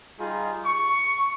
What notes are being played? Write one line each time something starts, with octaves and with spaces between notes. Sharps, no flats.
G3 D#4 F4 G#4
C#6